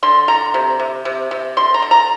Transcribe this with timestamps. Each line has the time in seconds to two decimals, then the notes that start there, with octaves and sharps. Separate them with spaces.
0.03 D3 C6
0.28 D3 A#5
0.54 C3
0.79 C3
1.05 C3
1.31 C3
1.57 D3 C6
1.74 A#5
1.82 D3
1.91 A#5